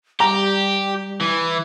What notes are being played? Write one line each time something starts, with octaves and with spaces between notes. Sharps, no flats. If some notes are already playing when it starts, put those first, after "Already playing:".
G3 G4 A#5
E3